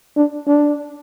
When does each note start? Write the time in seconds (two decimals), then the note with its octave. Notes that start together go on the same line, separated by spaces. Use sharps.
0.16 D4
0.47 D4